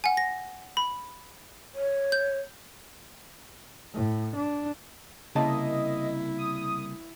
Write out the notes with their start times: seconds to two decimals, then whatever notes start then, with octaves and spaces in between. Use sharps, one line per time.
0.04 F#5 G#5
0.17 A#6
0.77 B5
1.75 C#5
2.12 G6
3.94 A2
4.36 D4
5.35 C2 C#3 A#3 E4 D#5 A5
6.38 D#6